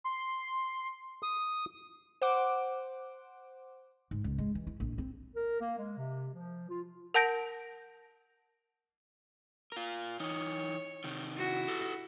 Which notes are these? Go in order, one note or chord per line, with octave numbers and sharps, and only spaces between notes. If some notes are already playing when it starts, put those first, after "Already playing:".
C6
D#6
C5 F#5 D6
G#2
C#2
G#3
E3
E4
A#1
C4
A#4
A#3
G#3
C3
F3
F4
A#4 F#5 A5 G6 A#6 D7
F4 A#4
E3 D#4 C#5
C3 D#3
E4 F#4
G4 A4